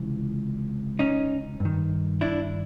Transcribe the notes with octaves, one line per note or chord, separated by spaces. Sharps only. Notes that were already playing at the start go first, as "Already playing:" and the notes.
Already playing: C#2 C3 E3
C#4 D#4
G2
D#3
D4 E4